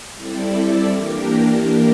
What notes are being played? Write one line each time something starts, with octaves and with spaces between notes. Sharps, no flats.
G3 C4 E4 A4 D5
E3 A#3 D4 G4 A#4